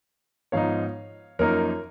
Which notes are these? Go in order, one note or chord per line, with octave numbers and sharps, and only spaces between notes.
G#2 F3 B3 D#4 C#5 F5
F#2 F3 A#3 D#4 A#4 C#5